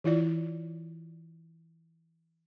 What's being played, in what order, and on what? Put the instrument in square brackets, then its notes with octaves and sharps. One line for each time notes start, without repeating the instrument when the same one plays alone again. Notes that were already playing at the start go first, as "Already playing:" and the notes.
[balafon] E3 E4 F4 D5